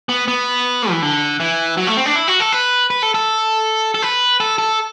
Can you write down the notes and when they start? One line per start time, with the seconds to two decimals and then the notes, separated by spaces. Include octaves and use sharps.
0.09 B3
0.28 B3
0.90 E3
1.02 D3
1.40 E3
1.77 F#3
1.87 A3
1.97 C4
2.06 D4
2.16 E4
2.28 F#4
2.40 A4
2.52 B4
2.90 B4
3.02 A4
3.15 A4
3.94 A4
4.02 B4
4.40 A4
4.58 A4